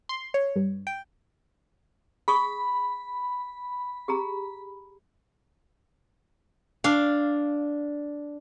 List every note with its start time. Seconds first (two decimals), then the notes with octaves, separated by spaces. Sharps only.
0.09 C6
0.34 C#5
0.56 G2
0.87 G5
2.28 G#4 B5 C#6 D#6
4.08 G4 G#4 A#5
6.84 D4 F5